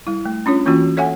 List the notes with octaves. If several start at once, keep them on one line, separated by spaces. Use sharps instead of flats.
G3 E4
A3
C#4 D4 F4 C#5
E3 A#3 C#4 F4 F#4
A4 C#5 E5 F#5 G#5